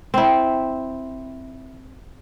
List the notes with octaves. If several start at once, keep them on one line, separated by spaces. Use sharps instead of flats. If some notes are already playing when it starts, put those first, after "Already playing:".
C4 E4